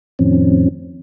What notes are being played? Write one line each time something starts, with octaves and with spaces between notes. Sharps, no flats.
F2 A2 D#3 F3 C4 C#4